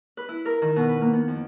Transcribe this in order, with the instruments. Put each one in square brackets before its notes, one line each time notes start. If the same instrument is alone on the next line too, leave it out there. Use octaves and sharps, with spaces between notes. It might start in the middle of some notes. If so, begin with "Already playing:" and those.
[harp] B4
E4
A#4
D#3
B2
B4
A#3
B3
F2